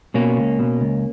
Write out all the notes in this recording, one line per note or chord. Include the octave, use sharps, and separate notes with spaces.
B2 A#3 C#4
C#2
B2
C#2